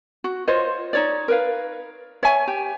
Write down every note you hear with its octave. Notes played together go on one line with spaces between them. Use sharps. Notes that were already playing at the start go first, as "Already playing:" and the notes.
F#4
F4 C5 C#5 D#5
D#4 C#5 D5
A#4 B4 F5
C#5 E5 G#5
G4